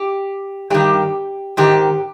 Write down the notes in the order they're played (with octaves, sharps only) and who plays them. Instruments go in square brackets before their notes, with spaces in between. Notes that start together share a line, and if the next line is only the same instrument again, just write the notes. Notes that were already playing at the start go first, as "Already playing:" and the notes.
Already playing: [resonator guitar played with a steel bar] G4
G2 D#3 G4
G#2 D#3 G4